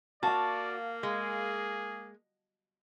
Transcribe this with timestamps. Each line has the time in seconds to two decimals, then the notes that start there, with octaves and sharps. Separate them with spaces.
0.23 A#3 F#4 D5 F5 A5
1.03 G#3 G#4 G#6